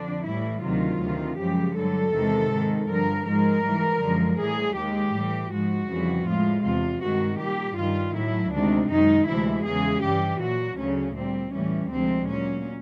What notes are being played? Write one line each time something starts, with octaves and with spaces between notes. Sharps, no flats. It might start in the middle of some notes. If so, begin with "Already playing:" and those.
Already playing: F2 D3 D4
A2 E3 G3 E4
D2 C3 D#3 F#3 F4
D2 C3 D#3
F#2 C#3 F3 G#3 G4
G2 D3 F#3 A4
E2 C3 D#3 G#3
G#2 D#3 G#3
G2 D3 F3 A#4
G#2 F3 G#3 A#4
G#2 E3 G3
F#2 D3 F3 G#3
A2 E3 G3 G#4
D#2 D#3 G#3 G4
A2 E3 G3
G#2 F3 G#3 F#4
F2 C#3 E3 G3
A2 F3 G#3 F4
E2 C3 F3 F4
G2 D#3 G#3 F#4
A#2 G3 G4
G2 D#3 G3 F4
A2 F#3 E4
D2 C3 D#3 G#3 D4
F#2 D#3 G#3 D#4
D2 C3 E3 G#3 E4
E2 C#3 E3 G#3 G#4
G2 E3 G3 G4
A#2 F#3 F#4
D2 C#3 F#3 C#4
A#2 G3 C4
A2 E3 G3 C#4
D2 C3 F3 G#3 C4
A#2 F#3 C#4